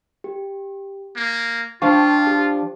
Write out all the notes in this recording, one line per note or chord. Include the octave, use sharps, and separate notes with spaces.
G4
A#3 G#6
F3 D4 F4 F5 G5 C#6
G4